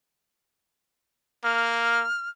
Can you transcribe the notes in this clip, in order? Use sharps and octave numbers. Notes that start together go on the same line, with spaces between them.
A#3 F6